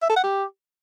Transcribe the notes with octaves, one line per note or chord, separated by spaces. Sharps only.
E5
A4
F#5
G4